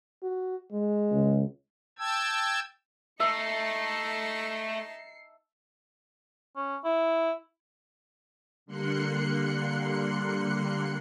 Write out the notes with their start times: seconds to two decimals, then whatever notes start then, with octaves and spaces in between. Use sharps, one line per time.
0.23 F#4
0.72 G#3
1.11 C#2
1.99 G5 A5 E6 G#6
3.20 A3 D#4 E5 A5 C7 C#7
6.56 C#4
6.85 E4
8.66 D3 G3 A#3 C6 F#6 C#7